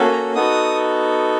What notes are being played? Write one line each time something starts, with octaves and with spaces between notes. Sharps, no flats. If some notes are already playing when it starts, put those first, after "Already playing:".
Already playing: A#3 C#4 F#4 A4
A#5
B3 D#4 F#4 A4 D#6